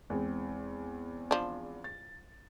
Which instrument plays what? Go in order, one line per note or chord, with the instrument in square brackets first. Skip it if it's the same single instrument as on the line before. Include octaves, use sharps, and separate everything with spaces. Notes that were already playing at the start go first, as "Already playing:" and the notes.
[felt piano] E2 G#3 C4
[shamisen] F3 D4
[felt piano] A6